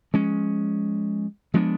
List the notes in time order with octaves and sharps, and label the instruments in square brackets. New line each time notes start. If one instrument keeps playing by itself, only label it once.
[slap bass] F3 G#3 C#4
F3 G#3 B3 D4